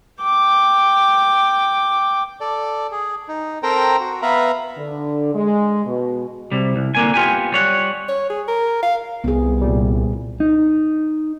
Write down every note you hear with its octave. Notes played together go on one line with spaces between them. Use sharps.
G5 D6
A4 D5
G#4
D#4
C4 A4 A#4 C5 G5 A#5
F#4
B3 B4 E5 F5 A#5 B5
D3
G#3
B2
C3 G3
C2
D3 A#3 G#5
B3 F4 G4 G#5
G3 C#5 F#5
C#5
G#4
A#4
F5
C2 B3 G#4
A#2 G3
D#4